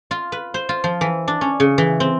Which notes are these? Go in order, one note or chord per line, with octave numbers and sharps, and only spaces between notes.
F4
B4
C5
F4
F3
E3
D4
C#4
C#3
E3
C4